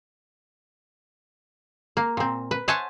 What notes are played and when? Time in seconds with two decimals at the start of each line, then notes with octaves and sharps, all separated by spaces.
1.97 A#3
2.17 A#2 C4
2.51 B4
2.68 C5 C#5 E5 F#5 G#5 A5